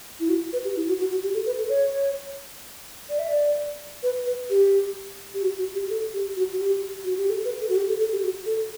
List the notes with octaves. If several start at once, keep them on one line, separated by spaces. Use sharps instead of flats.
E4
F#4
B4
G4
E4
F#4
F#4
F#4
G4
A4
B4
A4
C#5
D5
E5
D5
B4
B4
G4
G4
F#4
F#4
G4
A4
G4
F#4
F#4
G4
F#4
G4
A4
B4
A4
F#4
G4
A4
A4
G4
F#4
A4